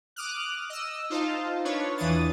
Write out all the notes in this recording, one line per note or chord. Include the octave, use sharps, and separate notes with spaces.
D6 D#6 F6 F#6
D#5 E6
D#4 F4 C5 D#5 F5 A5
D4 F4 B4 C#5
E2 E3 D4 D#6 A6